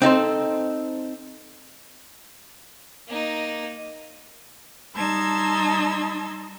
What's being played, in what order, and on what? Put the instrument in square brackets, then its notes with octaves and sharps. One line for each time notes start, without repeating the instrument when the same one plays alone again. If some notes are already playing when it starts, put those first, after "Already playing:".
[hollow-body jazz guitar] C4 D#4 A4 C5
[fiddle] A#3 D#4
[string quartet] G3 D#4 A5 C6 E6 G#6